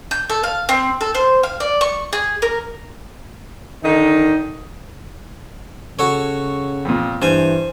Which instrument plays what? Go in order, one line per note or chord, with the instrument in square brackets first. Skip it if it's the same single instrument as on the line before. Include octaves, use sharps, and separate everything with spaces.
[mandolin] G6
A4
F5
C4
A4
C5
F5
D5
C#6
G#4
A#4
[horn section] D3 D#3 D#4
[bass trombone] C#3 [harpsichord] F#4 A4 C#5
[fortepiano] F2 A#2
[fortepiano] G2 [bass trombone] E3 [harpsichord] C5 G#5